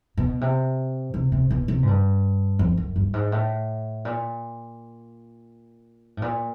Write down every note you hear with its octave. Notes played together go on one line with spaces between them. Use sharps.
B2
C3
C3
C3
B2
C3
G#2
G2
F2
F#2
G2
G#2
A2
A#2
A2
A#2